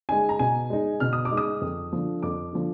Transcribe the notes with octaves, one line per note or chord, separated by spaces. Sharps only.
G#3 D#4 G#5
A#5
B2 G#5
G#3 D#4
B2 F6
D#6
D6
G#3 D#4
D#6
F2
D3 F3
F2 D6
D3 F3